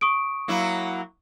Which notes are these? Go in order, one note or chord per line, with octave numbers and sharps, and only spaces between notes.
C#6 D#6 D7
F#3 A#3 E4